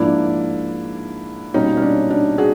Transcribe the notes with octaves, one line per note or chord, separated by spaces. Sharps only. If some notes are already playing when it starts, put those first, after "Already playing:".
Already playing: G#2 F3 A#3 D4 E4
B2 G3 A#3 C#4 D#4
C#4
D4
D4
F#4 G#4